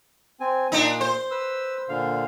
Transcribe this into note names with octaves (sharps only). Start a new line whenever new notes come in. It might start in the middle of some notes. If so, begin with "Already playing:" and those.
C4 G#5
A#2 D4 D#4
C5
B4 E6
A#2 D3 F5